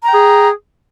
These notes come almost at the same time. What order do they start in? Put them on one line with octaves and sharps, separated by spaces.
A#5 G5 G#4